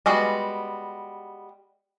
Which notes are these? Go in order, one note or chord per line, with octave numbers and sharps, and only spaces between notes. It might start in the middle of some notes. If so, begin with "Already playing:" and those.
G3 G#3 B3 F#4